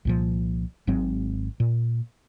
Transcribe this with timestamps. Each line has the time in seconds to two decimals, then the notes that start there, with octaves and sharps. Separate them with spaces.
0.05 C2 A#2 F3
0.87 G#1 G#2 F#3 C4
1.60 A#2